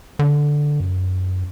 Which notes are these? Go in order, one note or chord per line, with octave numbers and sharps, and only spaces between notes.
D3
F#2